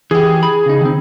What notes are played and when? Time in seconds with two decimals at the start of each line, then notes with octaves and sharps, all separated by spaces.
0.11 E3 G4 G#4
0.43 B5
0.66 C#3 D#4
0.81 D#3 C4